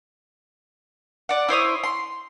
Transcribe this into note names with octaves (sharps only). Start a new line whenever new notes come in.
D5 F#5
E4 C5 C#5 D#6
C6